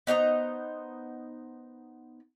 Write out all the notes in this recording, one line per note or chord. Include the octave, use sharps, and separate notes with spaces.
B3 D#4 C5 A#5